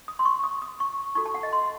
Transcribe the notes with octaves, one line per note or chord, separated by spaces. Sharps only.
D#6
C6
C#6
D#6
D#6
C#6
D#4 F#4 A4 C#6
A5
F#5
D#5
C6